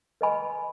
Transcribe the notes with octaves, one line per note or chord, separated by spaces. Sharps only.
B4 D#5 G#5 B5